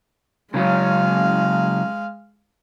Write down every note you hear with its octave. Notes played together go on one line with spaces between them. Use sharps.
C#3 F#3 G#3 C#4 F5